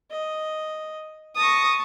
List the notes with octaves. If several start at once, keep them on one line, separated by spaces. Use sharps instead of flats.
D#5
A5 C#6 D#6 A#6